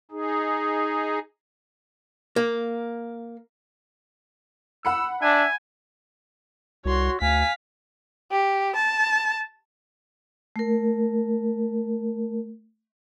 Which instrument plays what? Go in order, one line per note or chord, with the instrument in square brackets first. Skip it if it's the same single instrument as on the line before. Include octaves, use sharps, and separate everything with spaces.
[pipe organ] D#4 G#4
[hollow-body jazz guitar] A#3
[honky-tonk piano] F#5 B5 C#7 [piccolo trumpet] E6
[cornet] D4 [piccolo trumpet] E5 [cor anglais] G#5
[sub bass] C2 [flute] F#4 [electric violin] C#5 C6
[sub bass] D2 [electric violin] F5 B6 [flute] G#5
[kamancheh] G4
A5
[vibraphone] A3 A#4